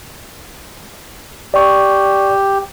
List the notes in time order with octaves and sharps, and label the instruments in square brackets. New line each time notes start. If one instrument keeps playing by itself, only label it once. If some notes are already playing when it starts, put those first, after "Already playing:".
[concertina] G4 [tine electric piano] D5 C#6